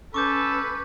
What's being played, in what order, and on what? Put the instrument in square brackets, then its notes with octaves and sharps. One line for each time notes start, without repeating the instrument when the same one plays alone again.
[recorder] C#4 [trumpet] A4 [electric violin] B4 [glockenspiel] C#6 D6 G6